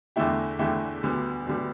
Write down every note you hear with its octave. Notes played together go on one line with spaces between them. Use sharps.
E2 D3 A3 E4 G4
E2 D3 A3 E4 G4
D2 D3 G3 B3
D2 D3 G3 B3